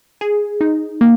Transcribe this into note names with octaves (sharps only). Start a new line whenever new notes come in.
G#4
D#4
A#3